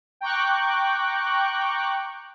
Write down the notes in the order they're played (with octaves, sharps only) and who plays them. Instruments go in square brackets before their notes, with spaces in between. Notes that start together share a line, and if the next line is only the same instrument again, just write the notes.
[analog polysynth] G5 A#5 C#6 D6 F#6